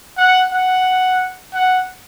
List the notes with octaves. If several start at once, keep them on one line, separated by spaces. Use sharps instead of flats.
F#5
F#5
F#5